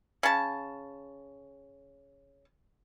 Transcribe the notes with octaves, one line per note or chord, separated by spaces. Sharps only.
C#3 A5